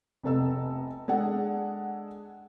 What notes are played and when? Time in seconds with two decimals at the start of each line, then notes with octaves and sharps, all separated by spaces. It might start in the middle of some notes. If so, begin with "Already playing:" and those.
0.23 F1 C3 B3 A4 D#5 E6
1.08 G#3 D4 G#4 A4 D5 F#5